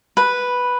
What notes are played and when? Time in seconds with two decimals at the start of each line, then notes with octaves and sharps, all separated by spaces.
0.17 B4